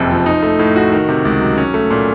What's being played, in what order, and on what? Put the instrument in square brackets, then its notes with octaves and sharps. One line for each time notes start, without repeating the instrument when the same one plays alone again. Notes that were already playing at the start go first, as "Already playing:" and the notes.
Already playing: [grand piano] F#1 F2 C3
F3
D#4
A3
A2
F#4
D#3
C3
C#2
F#3
C#4
A3
A#2